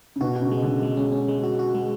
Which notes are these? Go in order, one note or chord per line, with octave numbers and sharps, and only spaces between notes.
C#3
B2 F#4
F#4
C#3
G#3
D3 G#3
G#3
C#4
C#4
G#3
F#4
F#4
G#3